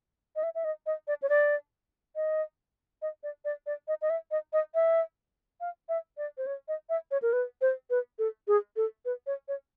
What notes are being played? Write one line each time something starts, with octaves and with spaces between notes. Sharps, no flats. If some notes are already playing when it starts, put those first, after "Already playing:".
D#5
E5
E5
D#5
D#5
D5
C#5
D5
D#5
D#5
D5
D5
D5
D#5
D#5
E5
D#5
D#5
E5
F5
E5
D5
C5
C#5
D#5
E5
C#5
A#4
B4
C5
B4
A4
G#4
A4
B4
C#5
C#5